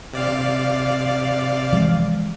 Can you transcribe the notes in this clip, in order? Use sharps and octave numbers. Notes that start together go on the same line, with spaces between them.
C3 D5 F5
E3 F3 G#3